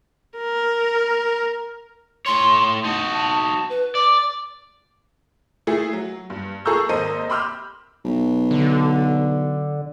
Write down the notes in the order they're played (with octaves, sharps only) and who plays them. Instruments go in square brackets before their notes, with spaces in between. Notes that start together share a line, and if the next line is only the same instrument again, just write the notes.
[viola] A#4
[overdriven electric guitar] A2 C#5 [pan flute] C6
[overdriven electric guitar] D#4 F#4 [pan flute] A5
[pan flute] B4
[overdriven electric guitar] D5 [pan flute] D6
[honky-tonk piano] A3 E4 G#4 E5
F#3
G2
G#4 A4 A#5 C#6 E6 G6
G#1 A#3 A4 C5 D#5 D#7
B5 C6 D6 E6 F6 G6
[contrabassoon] B1
[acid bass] D3